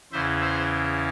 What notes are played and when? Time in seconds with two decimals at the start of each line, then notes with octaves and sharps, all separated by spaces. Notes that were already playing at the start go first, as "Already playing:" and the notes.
0.12 E2 C#3 E3 C5 E5
0.41 C5 E5